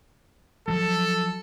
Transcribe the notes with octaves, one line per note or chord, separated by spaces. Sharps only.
F3 F#3 A4